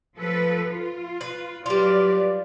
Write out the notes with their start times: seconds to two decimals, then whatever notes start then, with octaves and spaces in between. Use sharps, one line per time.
0.16 F3 A4 B4
0.69 F4
1.21 B4
1.66 F#3 G3 F4 B4 D5